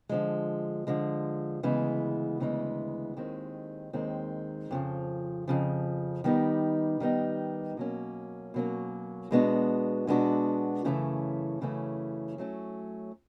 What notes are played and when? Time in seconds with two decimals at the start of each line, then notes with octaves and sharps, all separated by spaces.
0.09 D3 F3 G#3
0.87 D3 F3 G#3
1.63 D2 C#3 E3 G#3 B3
2.40 D2 C#3 E3 G#3 B3
3.17 D#2 D#3 G#3 C4
3.93 D#2 D#3 G#3 C4
4.71 F2 C#3 F3
5.48 F2 C#3 F3
6.24 D#3 G3 B3 D#4 G4
7.00 D#3 G3 B3 D#4 G4
7.77 B2 F#3 A#3 C#4
8.54 B2 F#3 A#3 C#4
9.31 B2 G#3 B3 D4 F#4
10.07 B2 G#3 B3 D4 F#4
10.85 F#2 C#3 E3 A3 C#4
11.61 F#2 C#3 E3 A3 C#4
12.38 F#3 A3 C#4